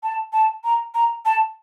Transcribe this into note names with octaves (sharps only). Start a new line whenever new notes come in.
A5
A5
A#5
A#5
A5